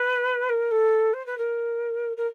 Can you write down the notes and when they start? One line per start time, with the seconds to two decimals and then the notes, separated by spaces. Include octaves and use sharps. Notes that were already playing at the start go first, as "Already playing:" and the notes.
Already playing: B4
0.49 A#4
0.71 A4
1.13 C5
1.26 B4
1.37 A#4
2.16 A#4